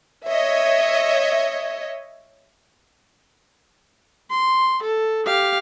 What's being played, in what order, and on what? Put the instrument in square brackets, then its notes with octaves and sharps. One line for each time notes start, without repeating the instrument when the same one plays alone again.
[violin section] C#5 D#5 E5
[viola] C6
A4
G4 F5